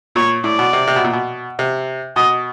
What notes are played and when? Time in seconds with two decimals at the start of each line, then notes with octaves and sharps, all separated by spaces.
0.16 A#2 C#5
0.44 A2 D5
0.59 B2
0.73 C3
0.87 C3
0.96 B2
1.05 A#2
1.13 B2
1.59 C3
2.16 B2 D#5